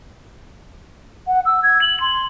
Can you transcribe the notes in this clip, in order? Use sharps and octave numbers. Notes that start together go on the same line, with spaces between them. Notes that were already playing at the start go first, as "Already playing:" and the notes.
F#5
E6
G#6
F#7
C6